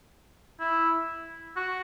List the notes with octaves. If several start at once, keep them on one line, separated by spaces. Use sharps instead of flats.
E4
F#4